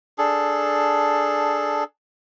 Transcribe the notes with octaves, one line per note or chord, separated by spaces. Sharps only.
D4 G#4 A4